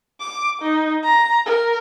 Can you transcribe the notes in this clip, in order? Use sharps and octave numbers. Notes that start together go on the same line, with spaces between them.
D6
D#4
A#5
A#4